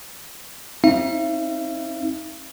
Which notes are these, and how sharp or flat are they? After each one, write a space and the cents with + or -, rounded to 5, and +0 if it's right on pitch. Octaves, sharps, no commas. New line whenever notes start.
C4 +40 D#4 +30 E5 +45